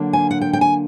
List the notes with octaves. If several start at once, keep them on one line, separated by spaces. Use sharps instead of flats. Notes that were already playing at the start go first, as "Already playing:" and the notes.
Already playing: D3 F#3 A#3 D4
G#5
F#5
G5
G5
G#5